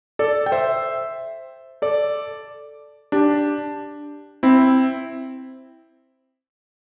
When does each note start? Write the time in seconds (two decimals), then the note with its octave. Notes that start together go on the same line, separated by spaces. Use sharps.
0.19 A4 D5
0.46 G5
0.52 C5 E5
1.82 A4 D5
3.12 D4 G4
4.43 C4 E4